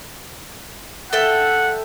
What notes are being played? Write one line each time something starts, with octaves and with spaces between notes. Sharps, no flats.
A4 E5 F#5 G5